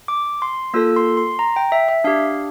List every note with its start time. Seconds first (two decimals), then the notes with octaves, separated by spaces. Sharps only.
0.08 D6
0.42 C6
0.74 A#3 F4 A4 E6
0.96 C6
1.17 C6
1.39 A#5
1.56 G5
1.72 E5
1.89 E5
2.04 D4 G4 F5